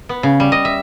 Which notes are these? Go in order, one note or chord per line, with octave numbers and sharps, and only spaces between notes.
B3
C#3
G3
D#5
E5